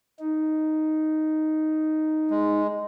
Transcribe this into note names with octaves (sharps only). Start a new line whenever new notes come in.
D#4
G#3